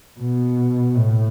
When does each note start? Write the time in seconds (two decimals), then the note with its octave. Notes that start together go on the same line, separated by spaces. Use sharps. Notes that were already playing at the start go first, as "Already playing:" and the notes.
0.19 B2
0.96 A2